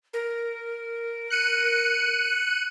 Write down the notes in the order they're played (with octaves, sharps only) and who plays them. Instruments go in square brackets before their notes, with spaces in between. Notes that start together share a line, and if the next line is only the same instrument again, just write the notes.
[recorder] A#4
[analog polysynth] F#6 C#7 D#7